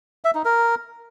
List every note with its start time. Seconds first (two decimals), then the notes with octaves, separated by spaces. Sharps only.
0.25 E5
0.35 D#4
0.45 A#4